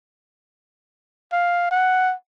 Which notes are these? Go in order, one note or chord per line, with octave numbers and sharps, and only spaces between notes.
F5
F#5